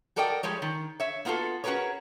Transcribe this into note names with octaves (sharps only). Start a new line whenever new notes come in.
F#4 A4 A#4 D5 D#5 G5
F3 G3 G#3 C#5
D#3
C#5 E5
A#3 B3 F4 F#4 A4
C#4 F#4 G#4 A#4 B4 C#5